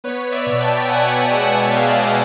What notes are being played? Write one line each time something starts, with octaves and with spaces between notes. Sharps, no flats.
B3 B4 C#5
D5 E5
B2
G5 A5
G5
B2 F#5 G#5
G5 A5
G#3
F#5 G#5
F#5
B3 D#5 F5